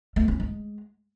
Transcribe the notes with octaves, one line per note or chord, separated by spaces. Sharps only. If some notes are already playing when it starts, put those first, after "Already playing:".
A3
C#4
G#3